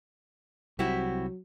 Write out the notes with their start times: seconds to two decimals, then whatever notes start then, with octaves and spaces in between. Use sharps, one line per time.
0.79 C2 F#3 C4 E4 F#4 G4